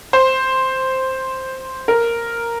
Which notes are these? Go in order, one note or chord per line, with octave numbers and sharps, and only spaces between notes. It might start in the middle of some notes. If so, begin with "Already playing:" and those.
C5
A#4